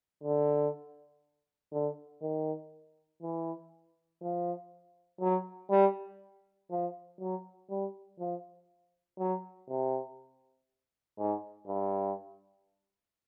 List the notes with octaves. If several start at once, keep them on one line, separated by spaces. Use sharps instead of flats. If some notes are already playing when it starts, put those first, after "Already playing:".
D3
D3
D#3
E3
F3
F#3
G3
F3
F#3
G3
F3
F#3
C3
G#2
G2